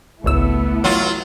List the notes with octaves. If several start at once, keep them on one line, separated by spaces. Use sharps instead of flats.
G#1 C#2 A3 B3 E4 E6
F#3 F4